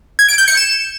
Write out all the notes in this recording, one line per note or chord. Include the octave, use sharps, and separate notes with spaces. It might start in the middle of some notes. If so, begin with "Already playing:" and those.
G#6
D7
G6
C#7
E7